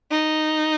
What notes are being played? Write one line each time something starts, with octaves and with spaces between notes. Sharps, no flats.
D#4